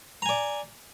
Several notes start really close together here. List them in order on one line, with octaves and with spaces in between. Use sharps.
A#5 G#5 D5